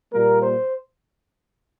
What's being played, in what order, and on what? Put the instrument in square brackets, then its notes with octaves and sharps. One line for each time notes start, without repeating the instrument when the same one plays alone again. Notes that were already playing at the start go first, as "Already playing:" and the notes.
[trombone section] A#2 G3 A#3 A#4
C5